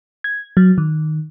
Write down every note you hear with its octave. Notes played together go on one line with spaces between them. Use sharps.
G#6
F#3
D#3